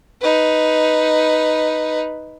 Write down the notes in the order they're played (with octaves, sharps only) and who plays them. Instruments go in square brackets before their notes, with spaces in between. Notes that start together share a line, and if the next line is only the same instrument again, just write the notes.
[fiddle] D#4 B4